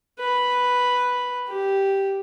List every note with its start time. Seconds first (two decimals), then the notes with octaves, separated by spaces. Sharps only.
0.19 B4
1.48 G4